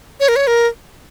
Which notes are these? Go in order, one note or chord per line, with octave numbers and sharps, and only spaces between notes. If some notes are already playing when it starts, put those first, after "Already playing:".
C#5
A#4
C#5
A#4